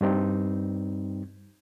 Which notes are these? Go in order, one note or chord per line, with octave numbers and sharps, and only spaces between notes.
G2 G3 C4 D#4